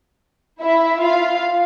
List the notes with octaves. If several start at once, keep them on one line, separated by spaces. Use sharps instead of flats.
E4 E5
F4 F5